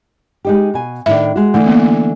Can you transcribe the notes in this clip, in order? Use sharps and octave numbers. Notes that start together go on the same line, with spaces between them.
G#3 D#4 G4
B2 G#5
A2 D#3 D4 E5
G#3 F#4
D3 E3 A3
A#3 B3